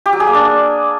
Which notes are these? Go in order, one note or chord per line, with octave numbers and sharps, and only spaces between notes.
G4
F#3
G#4
A#3
D4